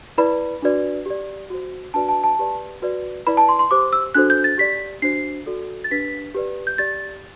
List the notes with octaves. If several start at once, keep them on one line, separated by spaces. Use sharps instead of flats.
E4 B4 D5 B5
D4 F#4 B4 D5
G4 D5
F#4 C5
D4 F#4 B4 D5 A5
A5
A5
G4 B4 D5
F#4 B4 D5
E4 B4 D5 B5
A5
C6
C6
G4 C5 D6
E6
D4 F#4 A4 C5 F#6
G6
A6
G4 D5 B6
D4 F#4 C5 C7
F#4 A4 D5
A6
D4 G4 B4 B6
G4 B4 D5
G6
G4 D5 A6